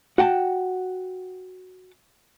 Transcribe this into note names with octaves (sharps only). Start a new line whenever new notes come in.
F#4 F#5 G5 A5